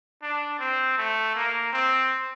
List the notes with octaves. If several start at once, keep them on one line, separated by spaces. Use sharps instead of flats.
D4
C4
A3
A#3
C4